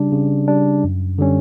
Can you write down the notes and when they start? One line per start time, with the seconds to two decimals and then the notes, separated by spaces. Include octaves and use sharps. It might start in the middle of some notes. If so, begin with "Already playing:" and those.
Already playing: C#3 G3 D4
0.12 C#3
0.48 G3 D4
0.84 F#2
1.18 D3 G3 C#4